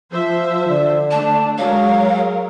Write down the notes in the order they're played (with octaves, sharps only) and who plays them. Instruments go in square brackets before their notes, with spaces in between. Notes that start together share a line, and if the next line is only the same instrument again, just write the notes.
[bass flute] F3 [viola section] C5 E5
[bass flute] D3
[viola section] A3 D4 [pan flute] A5
[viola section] F#3 G#3 A#4 [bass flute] C#5 [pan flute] F5